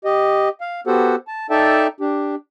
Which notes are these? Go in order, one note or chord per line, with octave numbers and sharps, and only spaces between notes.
G4 D#5
F5
B3 F#4 G4 A4 C5 F#5
A5
D#4 A4 D5 E5 G5 A5
D4 G4